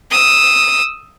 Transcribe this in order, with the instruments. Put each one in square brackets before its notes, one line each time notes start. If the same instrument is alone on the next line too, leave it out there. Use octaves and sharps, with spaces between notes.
[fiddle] D#6 E6